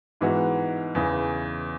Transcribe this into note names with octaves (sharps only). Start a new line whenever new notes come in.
G#2 E3 G#3 B3 F#4
E2 C#3 E3